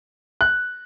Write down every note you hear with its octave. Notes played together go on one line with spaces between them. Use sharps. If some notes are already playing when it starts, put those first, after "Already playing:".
F#6